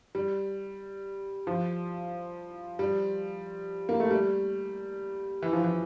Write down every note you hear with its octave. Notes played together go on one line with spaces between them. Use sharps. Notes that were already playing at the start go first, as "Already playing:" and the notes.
G3
F3
G3
A#3
A3
G3
E3
F3
E3